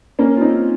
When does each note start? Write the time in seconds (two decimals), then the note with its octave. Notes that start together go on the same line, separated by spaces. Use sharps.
0.19 A#3 C#4
0.36 F4
0.41 C4 D#4